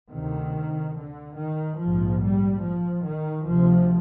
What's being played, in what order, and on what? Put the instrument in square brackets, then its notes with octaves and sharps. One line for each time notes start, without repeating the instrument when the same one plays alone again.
[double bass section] D2 C3 D#3
D3
D#3
A#1 G#2 F3
G3
F3
D#3
D2 C3 F3